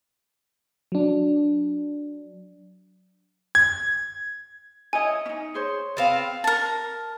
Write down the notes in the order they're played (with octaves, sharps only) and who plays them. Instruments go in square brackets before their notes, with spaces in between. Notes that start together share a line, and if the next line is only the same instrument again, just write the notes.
[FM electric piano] F#3 D4
[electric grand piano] G#6
[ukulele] E4 C#5 D#5 [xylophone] G#5
[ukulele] C#4 D#4
G#4 C5 C#5
[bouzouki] B3 C4 F5
[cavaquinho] A#4 A5